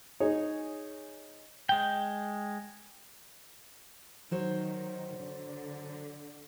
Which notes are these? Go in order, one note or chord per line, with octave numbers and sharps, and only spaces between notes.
D#4 G#4 C#5
G#3 G5
D#3 F#3 C5 C#5
D3